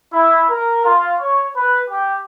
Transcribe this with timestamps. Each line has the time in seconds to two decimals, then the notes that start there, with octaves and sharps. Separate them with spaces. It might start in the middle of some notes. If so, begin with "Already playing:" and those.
0.13 E4
0.50 A#4
0.85 F4
1.20 C#5
1.56 B4
1.90 G4